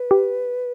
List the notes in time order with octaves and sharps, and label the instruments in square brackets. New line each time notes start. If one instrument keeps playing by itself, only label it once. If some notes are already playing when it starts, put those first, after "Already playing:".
Already playing: [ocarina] B4
[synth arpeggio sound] G4